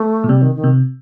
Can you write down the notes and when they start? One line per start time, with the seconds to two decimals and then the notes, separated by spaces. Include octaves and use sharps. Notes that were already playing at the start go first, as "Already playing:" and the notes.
Already playing: A3
0.24 A#2
0.29 C3 G3
0.42 D#3
0.55 D#3
0.64 C3